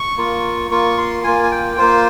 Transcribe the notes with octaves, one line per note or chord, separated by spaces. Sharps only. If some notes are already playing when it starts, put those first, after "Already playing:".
Already playing: C#6
A#3 F4
A#3 F4 C#6
C6
A#3 F4 G#5
G#5
G5
A#3 F4 C5